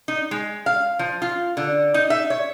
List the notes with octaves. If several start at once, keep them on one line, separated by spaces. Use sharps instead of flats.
D#4
G#3
F5
F3
F4
D3
D#4
E5
C#5